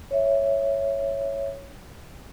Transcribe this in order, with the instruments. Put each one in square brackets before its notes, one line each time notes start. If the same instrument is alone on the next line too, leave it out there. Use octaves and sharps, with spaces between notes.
[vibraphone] C#5 E5